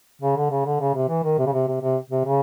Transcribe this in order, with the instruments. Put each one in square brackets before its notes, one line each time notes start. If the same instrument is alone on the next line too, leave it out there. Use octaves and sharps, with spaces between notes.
[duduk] C#3
D3
C#3
D3
C#3
C3
E3
D#3
C3
C#3
C3
C3
C3
C3
C#3